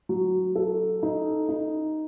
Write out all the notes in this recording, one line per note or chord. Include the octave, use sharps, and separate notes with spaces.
F#3
A4
D#4
D#4